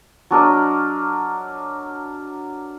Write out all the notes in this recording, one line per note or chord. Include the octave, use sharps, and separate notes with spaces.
F#3 D4 A#4 D#5